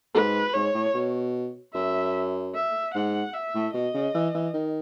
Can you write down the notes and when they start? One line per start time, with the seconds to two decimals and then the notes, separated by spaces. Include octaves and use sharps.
0.15 G#2 B4
0.54 G#2 C#5
0.75 A2
0.94 B2
1.74 F#2 E5
2.55 E5
2.95 G#2 F#5
3.34 E5
3.54 A2
3.74 B2 D#5
3.94 C#3
4.14 E3
4.34 E3
4.54 D#3